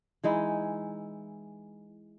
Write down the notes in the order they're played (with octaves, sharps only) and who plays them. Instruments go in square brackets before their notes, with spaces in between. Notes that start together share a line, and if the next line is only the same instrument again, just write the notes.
[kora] E3 G#3 D#4 E4